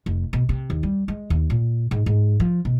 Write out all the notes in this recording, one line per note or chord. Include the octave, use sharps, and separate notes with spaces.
F1
B2
C3
D#2
G3
G#3
D#2
A#2
G#2
G#2
F3
B2